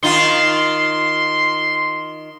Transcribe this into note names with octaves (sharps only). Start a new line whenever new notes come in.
D#3 D#4 F4 C6